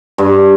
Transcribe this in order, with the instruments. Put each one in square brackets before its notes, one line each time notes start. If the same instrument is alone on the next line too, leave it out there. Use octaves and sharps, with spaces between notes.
[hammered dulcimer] G2